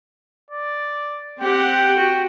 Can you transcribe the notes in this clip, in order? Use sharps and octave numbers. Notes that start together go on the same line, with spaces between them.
D5
C4 G4 F#5 G5
F#4